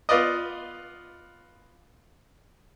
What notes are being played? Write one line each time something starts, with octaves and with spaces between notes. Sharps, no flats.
B3 F4 B4 D5 D#5